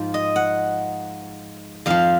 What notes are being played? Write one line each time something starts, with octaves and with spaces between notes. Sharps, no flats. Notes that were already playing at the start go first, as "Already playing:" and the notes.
Already playing: G#2 F3
D#5
F#5
F2 F3 F5